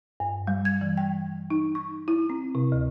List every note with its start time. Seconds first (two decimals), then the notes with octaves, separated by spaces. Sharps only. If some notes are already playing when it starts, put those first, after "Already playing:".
0.20 G2
0.47 G3
0.65 G#6
0.81 E3
0.97 G5
1.50 D#4
1.75 C#6
2.08 E4
2.30 C4
2.55 C3
2.72 D2